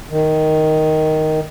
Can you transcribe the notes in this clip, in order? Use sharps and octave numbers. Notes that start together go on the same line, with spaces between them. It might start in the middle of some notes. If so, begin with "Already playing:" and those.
D#3